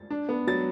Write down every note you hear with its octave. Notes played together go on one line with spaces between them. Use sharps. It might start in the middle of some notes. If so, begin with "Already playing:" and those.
Already playing: A6
D4
B3
F#3 A6